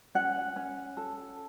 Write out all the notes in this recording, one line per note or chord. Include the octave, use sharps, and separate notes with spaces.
C#4 F#5
C#4
A4